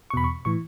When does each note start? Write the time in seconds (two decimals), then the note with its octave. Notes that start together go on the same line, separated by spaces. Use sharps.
0.10 C#6
0.14 E2 B2 B5
0.24 C#6
0.45 A2 E3 C#6